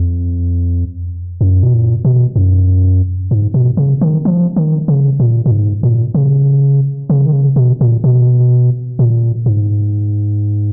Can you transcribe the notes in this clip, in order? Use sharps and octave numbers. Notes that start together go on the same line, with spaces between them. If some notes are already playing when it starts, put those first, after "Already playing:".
Already playing: F2
F#2
B2
A#2
B2
F#2
G#2
B2
C#3
D#3
F3
D#3
C#3
A#2
A#2
G#2
A#2
C#3
C#3
D#3
C#3
B2
A#2
B2
A#2
G#2